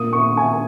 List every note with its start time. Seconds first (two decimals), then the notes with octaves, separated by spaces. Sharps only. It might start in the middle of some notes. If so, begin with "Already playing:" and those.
Already playing: A#2 A#3 D#6
0.13 C#6
0.37 G#5